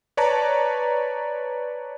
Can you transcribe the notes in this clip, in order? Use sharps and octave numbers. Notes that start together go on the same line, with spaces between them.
B4 C#5 D5 A5 A#5